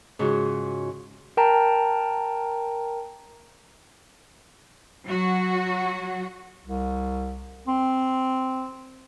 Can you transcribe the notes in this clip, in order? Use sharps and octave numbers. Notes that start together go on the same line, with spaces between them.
G#2 C#3 F4 F#4 G#4
A#4 G5 A5 A#5
F#3 F#4
C2
C4